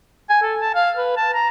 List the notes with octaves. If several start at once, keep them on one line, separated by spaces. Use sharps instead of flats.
G#5
A4
A5
F5
B4
A5
A#5